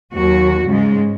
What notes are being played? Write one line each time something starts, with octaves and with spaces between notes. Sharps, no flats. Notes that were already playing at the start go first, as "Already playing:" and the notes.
D#2 F#3 F#4
G#2 C#3 G#3